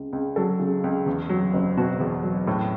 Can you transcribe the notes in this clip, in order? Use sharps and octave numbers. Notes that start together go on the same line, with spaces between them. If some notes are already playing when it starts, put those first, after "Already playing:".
Already playing: C#2
C#2
F#3 A4
C#3
C#2
E2
F#3
F#1
B2 F#4
E2
F#3
A2